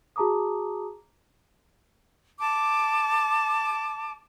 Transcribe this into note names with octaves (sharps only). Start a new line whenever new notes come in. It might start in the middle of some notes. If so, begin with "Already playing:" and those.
F#4 G#4 A5 A#5 D6 D#6
A5 D6